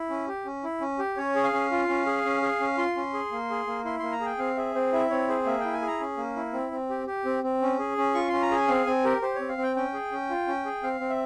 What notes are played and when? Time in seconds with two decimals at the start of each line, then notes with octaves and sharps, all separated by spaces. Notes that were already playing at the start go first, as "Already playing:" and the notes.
Already playing: E4
0.09 C#4
0.28 G4
0.45 C#4
0.64 E4
0.81 C#4
0.99 G4
1.17 C#4 C#5
1.35 G#4
1.44 F5
1.53 C#4
1.71 F4
1.89 C#4
2.06 G#4
2.25 C#4
2.42 G#4
2.61 C#4
2.78 F4 C6
2.97 C#4
3.14 G#4
3.32 A#3
3.50 G#4
3.67 A#3
3.85 E4 C6
3.99 A#3 C6
4.12 A#5
4.21 G#4 G5
4.39 C4 F5
4.57 G#4 E5
4.75 C4 C5
4.93 E4 E5
5.10 C4 C#5
5.28 G#4 C5
5.46 A#3 E5
5.60 E4 G5
5.73 G#5
5.82 G#4
5.87 A#5
6.00 C#4
6.17 A#3
6.36 E4
6.53 C4
6.71 C4
6.90 G4
7.07 G4
7.25 C4
7.44 C4
7.62 C#4
7.79 G#4
7.97 C#4
8.14 F4 C#6
8.28 C#4 C6
8.42 A#5
8.51 G#4 G#5
8.68 C4 F5
8.86 C4 G#5
9.05 G4 A#4
9.22 G4 C5
9.35 C4 C#5
9.49 F5
9.58 C4
9.63 G5
9.76 C#4 G5
9.94 G#4
10.12 C#4
10.30 F4
10.48 C#4
10.65 G#4
10.83 C4 F5
11.00 C4
11.10 E5